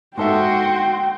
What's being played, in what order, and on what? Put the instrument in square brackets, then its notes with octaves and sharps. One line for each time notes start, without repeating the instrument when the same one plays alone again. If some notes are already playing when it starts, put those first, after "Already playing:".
[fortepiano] G#2 A4 E5 [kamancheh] F#4 [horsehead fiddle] G5 [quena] C6